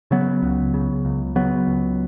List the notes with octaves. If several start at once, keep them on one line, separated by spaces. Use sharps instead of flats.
C#3 F#3 B3
C#2
C#3
C#2
C#3 F#3 B3
C#2